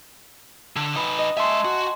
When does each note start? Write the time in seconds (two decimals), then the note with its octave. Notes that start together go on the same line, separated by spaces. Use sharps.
0.76 D3
0.96 D#4 B4
1.19 D#5
1.37 G#3 E5 G#5 A5 C6
1.65 F#4